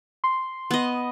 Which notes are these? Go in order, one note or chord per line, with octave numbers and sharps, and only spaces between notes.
C6
B3 D#5